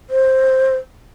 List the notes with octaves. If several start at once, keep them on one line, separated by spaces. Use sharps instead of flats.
C5